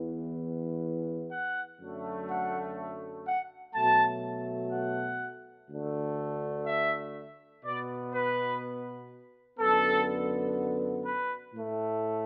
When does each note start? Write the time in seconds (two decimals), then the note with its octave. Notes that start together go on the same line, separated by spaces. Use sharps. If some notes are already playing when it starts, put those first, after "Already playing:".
Already playing: E2 E3 B3
1.31 F#5
1.80 F#2 D3 F#3 A3
2.29 F#5
3.26 F#5
3.75 B2 F#3 A3 A5
4.73 F#5
5.70 D2 D3 A3
6.67 E5
7.65 B2 B3 D5
8.13 B4
9.60 F#2 D3 B3 A4
11.06 B4
11.54 A2 A3